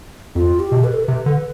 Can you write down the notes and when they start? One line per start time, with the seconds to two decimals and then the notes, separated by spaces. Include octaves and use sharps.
0.35 F2 F4
0.60 G4
0.72 B2
0.84 B4
0.93 A4
1.04 C3 B4
1.26 D3